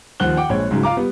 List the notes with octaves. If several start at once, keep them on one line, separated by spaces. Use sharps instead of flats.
D#2 F3 F#5 F#6 G7
F#5 G5 D6
A#1 G#3 C#5
G#2 C#3 F#3
F4 F5 A#5 D6
G3 B3